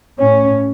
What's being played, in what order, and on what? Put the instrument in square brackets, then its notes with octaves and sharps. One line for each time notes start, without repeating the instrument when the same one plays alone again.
[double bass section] A2 C#4